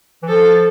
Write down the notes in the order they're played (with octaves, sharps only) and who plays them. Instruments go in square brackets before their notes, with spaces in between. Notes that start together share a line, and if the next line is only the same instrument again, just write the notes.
[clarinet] E3
[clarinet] F3 [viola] A4